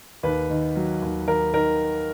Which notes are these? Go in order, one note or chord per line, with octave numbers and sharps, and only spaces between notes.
D#2 B4
D#3
F#3
D#2
D#2 A#4
D#3 A#4